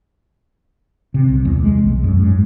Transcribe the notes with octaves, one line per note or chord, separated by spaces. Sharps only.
C3
C2
E2
G#3
B1
F#2
G#2